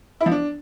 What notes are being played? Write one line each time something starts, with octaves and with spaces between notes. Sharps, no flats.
E4
F3
D4